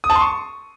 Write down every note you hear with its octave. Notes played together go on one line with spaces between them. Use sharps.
D#6
A5
C6
C#6